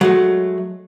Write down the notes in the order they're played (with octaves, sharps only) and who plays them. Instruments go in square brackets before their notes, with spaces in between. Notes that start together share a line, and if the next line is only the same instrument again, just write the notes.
[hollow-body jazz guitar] F#3 G#3 A3